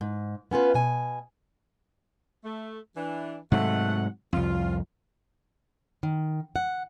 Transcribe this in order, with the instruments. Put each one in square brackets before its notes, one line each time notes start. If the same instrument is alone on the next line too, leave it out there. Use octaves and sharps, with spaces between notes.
[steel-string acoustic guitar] G#2
B3 C#4 F4 B4
B2 G#5
[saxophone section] A3
E3 D4
[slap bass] G#2 C3 F#3 [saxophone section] A3 F#5
[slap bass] C2 F2 [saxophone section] F4
[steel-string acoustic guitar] D#3
F#5